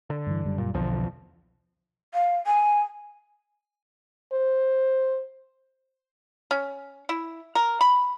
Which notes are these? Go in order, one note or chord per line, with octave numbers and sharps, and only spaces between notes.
D3
G2 E3
F#1 F#2 G3
A#2
B1 E2 D3 F3
F5
G#5
C5
C#4
E4
A#4
B5